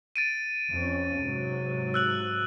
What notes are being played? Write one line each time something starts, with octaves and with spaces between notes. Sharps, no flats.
A6 D7 D#7
F2 C#4
G#2 C3 F#3
E6 F#6 F#7